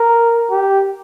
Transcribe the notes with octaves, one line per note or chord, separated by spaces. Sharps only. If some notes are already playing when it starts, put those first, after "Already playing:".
Already playing: A#4
G4